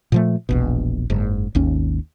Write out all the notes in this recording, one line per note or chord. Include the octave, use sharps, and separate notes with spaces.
A#2 F3 A3
E1 A#1 B2
F#1 G#2
G#1 D#2 C#4